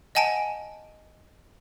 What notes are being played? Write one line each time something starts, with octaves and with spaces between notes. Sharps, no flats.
D#5 F#5 G#5 A5 D7